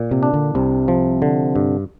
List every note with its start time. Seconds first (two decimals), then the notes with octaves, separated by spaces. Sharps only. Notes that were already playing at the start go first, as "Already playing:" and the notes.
Already playing: A#2
0.11 C3
0.23 D4
0.34 D3
0.55 C2 C3
0.88 F3
1.22 D3
1.56 G2